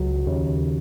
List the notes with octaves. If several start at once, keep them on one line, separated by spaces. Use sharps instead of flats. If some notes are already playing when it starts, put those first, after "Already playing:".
Already playing: C#2 F#3
D#2 C#3